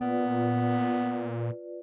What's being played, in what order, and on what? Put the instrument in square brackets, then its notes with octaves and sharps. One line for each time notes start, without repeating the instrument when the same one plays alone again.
[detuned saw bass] A#2 [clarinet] B3 [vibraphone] F4 B4 D5